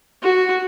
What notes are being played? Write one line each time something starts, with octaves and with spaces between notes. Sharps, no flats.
F#4